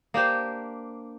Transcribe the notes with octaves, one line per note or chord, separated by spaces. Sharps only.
A#3 D4 G4 C5